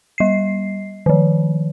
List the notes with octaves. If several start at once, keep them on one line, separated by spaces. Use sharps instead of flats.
G3 C7
D#3 F3